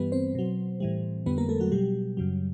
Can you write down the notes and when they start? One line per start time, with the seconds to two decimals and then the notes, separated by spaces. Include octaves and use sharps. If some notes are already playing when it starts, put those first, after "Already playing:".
Already playing: G2 E3 G3 B3 B4
0.12 C4 C5
0.35 B2 F#3
0.80 A2 E3 G3
1.26 F2 D3 G3 B3 B4
1.38 A#3 A#4
1.49 A3 A4
1.60 F#3 F#4
1.72 B2 F#3 G3 G4
2.17 F#2 C#3 F#3